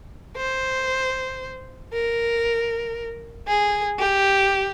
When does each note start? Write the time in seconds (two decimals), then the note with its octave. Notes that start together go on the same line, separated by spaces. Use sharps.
0.37 C5
1.92 A#4
3.47 G#4
3.99 G4